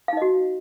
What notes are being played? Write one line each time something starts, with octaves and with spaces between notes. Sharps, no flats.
D#4 F#4 D#5 F5